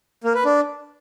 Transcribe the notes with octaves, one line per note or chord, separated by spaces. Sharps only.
A#3
B4
D4